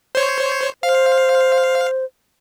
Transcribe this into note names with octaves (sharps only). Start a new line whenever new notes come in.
C5 C#5
C5 F5